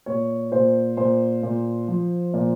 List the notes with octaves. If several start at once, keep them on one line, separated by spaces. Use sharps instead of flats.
A#2 C#5
A#2 C5
A#2 C5
A#2
F3
A#2